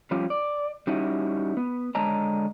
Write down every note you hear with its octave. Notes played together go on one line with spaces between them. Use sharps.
F3 G3 C#4 F4 G4
D5
G3 C#4 D#4 E4 F#4
B3
D3 G#3 C#5 D#5 A5 A#5